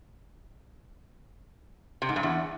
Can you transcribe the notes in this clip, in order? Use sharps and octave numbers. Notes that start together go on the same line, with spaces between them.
C3
G#2
G2
E2